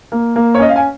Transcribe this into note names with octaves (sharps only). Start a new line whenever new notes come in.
A#3
A#3
C#5
C#4 D#5
F5
G#5